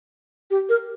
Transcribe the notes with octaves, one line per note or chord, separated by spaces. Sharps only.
G4
A#4